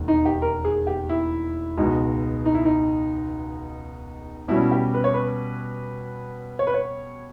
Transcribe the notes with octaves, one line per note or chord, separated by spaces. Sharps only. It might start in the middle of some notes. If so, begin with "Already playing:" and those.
Already playing: E1 D#2 D#3
D#4
G4
A#4
G#4
G4
E4
C#2 B2 G#3 D#4
D#4
E4
D#4
B2 G3 C#4 E4
G4
B4
C#5
B4
C#5
B4
C#5